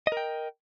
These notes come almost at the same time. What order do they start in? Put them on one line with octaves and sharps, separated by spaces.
D#5 A#4 G5